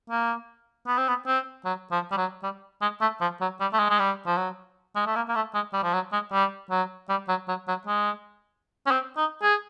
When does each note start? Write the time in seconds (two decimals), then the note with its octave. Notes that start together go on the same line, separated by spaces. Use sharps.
0.10 A#3
0.87 B3
0.98 C4
1.08 B3
1.27 C4
1.65 F#3
1.91 F3
2.12 G3
2.17 F#3
2.43 G3
2.82 G#3
3.01 A3
3.21 F3
3.41 F#3
3.60 G3
3.73 A3
3.79 G#3
3.90 G#3
3.99 G3
4.27 F3
4.37 F#3
4.96 G#3
5.06 A3
5.16 A#3
5.29 A#3
5.35 A3
5.54 G#3
5.73 G3
5.83 F3
5.94 F#3
6.12 G#3
6.32 G3
6.70 F#3
7.09 G3
7.29 F#3
7.48 F#3
7.68 F#3
7.87 G#3
8.86 C#4
8.91 C4
9.17 D#4
9.42 G#4